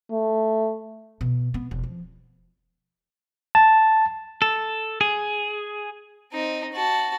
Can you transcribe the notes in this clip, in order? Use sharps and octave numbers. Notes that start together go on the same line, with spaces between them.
A3
B2
B3
E1
F3
A5
A4
G#4
C4 D#4
F#4 A5